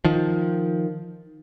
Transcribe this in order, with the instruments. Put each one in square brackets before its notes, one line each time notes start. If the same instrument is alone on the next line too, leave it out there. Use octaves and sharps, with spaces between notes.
[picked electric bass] D#3 F3